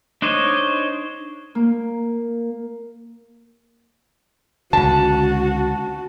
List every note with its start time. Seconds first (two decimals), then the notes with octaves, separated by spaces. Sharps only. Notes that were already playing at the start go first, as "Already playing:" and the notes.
0.22 D4 D#4 C5 C#5 D#5
1.55 A#3
4.73 C#2 D3 F#4 A5